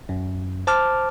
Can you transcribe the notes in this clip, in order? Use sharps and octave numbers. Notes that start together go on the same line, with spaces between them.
F#2
C5 A5 D6 F6